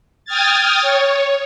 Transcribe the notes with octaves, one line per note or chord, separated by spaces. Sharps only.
G5 D#6 F6 G#6 A6
C#5